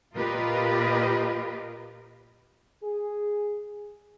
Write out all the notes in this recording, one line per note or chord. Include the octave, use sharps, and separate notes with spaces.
A#2 F4 G4 A#4 B4 D#5
G#4